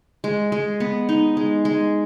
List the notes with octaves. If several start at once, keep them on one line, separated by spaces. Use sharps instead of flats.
G#3
G#3
B3
D#4
G#3
G#3